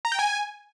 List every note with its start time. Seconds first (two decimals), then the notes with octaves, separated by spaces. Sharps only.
0.05 A#5
0.12 G5
0.19 G#5